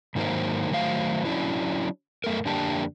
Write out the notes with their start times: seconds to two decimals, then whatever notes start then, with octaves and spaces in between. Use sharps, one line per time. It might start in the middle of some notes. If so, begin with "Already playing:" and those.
0.15 G#2 D#3 F#3 A#3 C5
0.71 D#3 F#3 A3 C5 F5
1.25 F#3 C#4 D4 E4
2.24 F#2 A3 A4 A#4
2.45 F2 D3 A#3 D4 G4 A5